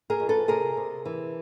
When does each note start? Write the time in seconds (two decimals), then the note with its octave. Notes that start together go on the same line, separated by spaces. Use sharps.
0.10 G#4 A#4
0.19 F2
0.29 A4 B4
0.48 C3 G#4 A#4
0.77 C3
1.05 E3